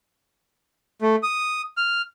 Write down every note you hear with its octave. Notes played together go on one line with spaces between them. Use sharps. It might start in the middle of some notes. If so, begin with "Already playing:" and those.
A3
D#6
F6